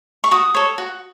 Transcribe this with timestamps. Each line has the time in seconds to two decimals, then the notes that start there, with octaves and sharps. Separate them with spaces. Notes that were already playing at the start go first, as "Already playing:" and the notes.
0.24 C#6
0.31 F#4 D#6
0.55 A4 C#5
0.78 F#4